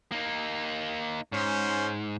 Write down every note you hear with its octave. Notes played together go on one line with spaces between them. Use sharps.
A#3 D#4
G#2 C#4 C5